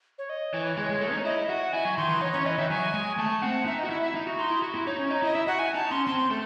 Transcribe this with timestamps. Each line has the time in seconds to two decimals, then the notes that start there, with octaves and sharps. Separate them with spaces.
0.18 C#5
0.30 D#5
0.53 E3 C#5
0.77 G#3
0.89 G#3
1.01 A3
1.13 D#4
1.25 E4 D#5
1.49 F#4 F#5
1.73 E4 G#5
1.85 F#3
1.97 D#3 C6
2.09 E3
2.21 D#4 C#5
2.33 C#4 C#5
2.45 E3 D#5
2.58 D#3 E5
2.70 F#3 G#5
2.94 G#3
3.18 A3 A5
3.42 C4 F#5
3.66 D#4 E5
3.79 D#5
3.84 F#4
3.90 E4 E5
4.02 E5
4.15 D#4
4.27 F#4
4.39 D#4 C6
4.50 E4
4.62 F#4
4.75 E4
4.87 D#4 C#5
4.99 C#4
5.10 D#4 D#5
5.22 E4 D#5
5.35 E4 E5
5.47 F#4 F#5
5.59 G#5
5.75 D#4 A5
5.91 C#4 C6
6.07 C4 C6
6.31 A3